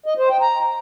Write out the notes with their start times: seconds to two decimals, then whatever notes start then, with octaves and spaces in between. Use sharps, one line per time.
0.06 D#5
0.18 C5
0.30 G5
0.42 A#5